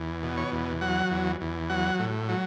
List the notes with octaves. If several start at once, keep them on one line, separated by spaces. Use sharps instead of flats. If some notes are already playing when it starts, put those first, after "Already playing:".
Already playing: E2
B2
C#5
E2
F#3 F#5
E2
E2
F#3 F#5
A2
F#3